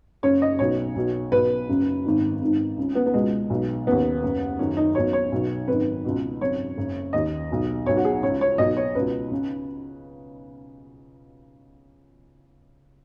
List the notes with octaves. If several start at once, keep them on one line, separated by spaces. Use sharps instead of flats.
F#1 F#2 C#3 C#5
D#5
B1 B2 C#5
B1 B2
B1 B2 B4
F#1 F#2 C#3
G#1 G#2 D#3
G#1 G#2 D#3
C#2 C#3
B3
B3
C#2 B2 G#3
B1 B2
D#2 C#3 B3
F#1 F#2 C#3
F#1 F#2 D#3 C#4
D#4
B1 B2 C#5
C#5
B1 B2
G#1 F#2 D#3 B4
C#2 B2
G#1 F#2 C#3 C#5
F#1 F#2 C#3
D#2 D#3 D#5
B1 B2
B1 B2 C#5
F#4
G#4
C#2 C#3 C#5
C#5
B1 B2 D#5
C#5
C#2 B2 B4
C#3